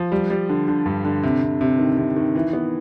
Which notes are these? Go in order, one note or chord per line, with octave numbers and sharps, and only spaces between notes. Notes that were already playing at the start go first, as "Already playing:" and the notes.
Already playing: F3
G3
G3
D3
D3
G2
D3
C3
C3
C3
D#3
C3
D#3
E3
B3